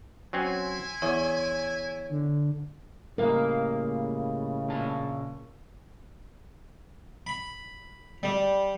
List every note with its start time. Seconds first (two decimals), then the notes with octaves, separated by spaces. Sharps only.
0.33 F#3 C4 C#4 E4 G#5 C6
1.02 E2 C#5
2.09 D3
3.18 A2 C#3 G3 G#3 A#3 A#4 F5
4.68 A#2 A5
7.27 B5
8.23 G3